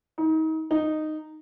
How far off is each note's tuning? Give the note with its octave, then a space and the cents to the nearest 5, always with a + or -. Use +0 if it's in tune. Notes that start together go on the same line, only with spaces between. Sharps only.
D#4 +35
D#4 -10